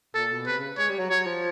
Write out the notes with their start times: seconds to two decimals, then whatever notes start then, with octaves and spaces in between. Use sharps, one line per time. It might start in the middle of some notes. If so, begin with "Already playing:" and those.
0.15 A#2 A4
0.31 B2
0.47 C3 B4
0.58 C#3
0.78 G#3 C#5
0.89 G3
0.99 F#3
1.10 F#3 C#5
1.27 F3